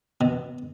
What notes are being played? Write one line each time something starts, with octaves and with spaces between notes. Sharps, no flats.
B2